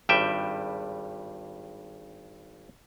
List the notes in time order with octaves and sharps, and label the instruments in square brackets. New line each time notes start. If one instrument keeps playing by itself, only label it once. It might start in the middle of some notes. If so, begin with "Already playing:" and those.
[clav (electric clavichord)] G#1 G2 G3 E5 G5